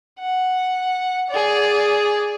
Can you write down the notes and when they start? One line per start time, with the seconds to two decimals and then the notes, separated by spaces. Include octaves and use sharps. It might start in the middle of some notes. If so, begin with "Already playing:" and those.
0.20 F#5
1.30 G#4 D5